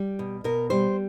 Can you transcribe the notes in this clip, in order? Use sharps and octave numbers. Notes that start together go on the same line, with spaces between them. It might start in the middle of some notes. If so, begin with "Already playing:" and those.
Already playing: G3
B2
B2 A#4
G3 C5